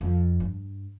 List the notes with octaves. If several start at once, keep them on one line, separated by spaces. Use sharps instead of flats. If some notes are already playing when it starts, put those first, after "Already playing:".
F2
G2